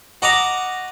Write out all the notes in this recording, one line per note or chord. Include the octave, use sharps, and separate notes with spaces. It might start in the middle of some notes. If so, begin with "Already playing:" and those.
F#4 D#5 F#5 A#5 D6 D#6